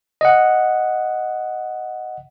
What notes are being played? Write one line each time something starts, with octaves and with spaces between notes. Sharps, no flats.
D#5 F#5